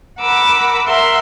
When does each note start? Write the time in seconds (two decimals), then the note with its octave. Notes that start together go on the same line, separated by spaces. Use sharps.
0.20 A#4 F#5 B5 D6 E6
0.87 A#4 E5 F#5 C6